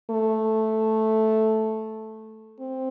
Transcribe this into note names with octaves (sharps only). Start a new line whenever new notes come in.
A3
C4